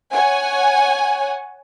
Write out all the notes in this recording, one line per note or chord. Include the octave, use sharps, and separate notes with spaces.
C#5 F#5 G#5